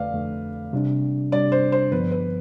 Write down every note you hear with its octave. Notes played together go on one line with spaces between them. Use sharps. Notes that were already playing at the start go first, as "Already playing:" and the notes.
Already playing: F2 D3 A3 B4 D5 F5
F2 D3 A3
C3 G3 D4
C3 G3 D4 D5
C5
C5
G2 D3 F3 B3 B4
B4